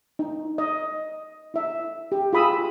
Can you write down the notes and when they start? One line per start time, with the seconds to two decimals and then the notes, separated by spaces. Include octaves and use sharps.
0.19 D#4
0.58 D#5
1.54 E4 E5
2.12 G4
2.33 F4 G#4 B5 D#6 E6